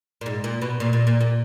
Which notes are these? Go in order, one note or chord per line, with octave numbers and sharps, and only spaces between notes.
A#2
G#2
A#2
B2
A#2
A#2
A#2
A#2